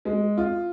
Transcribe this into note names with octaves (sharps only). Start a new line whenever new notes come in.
G#3
F4